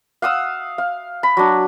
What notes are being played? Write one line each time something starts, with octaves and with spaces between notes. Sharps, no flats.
F5 F#5 D#6 E6
F5
B5
F#3 D4